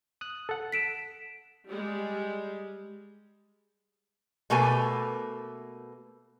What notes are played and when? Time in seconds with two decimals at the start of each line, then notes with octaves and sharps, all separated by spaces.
0.21 D#6 F#6
0.49 A4 F#5
0.72 B6 D7 E7
1.68 G3 G#3
4.50 B2 A3 A#3 B4 G#5